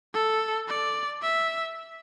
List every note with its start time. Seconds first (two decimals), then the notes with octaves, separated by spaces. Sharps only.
0.14 A4
0.68 D5
1.22 E5